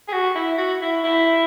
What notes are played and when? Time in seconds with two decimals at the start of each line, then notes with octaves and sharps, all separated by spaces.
0.08 G#4
0.13 F#4
0.35 E4
0.58 F#4
0.82 E4
1.04 E4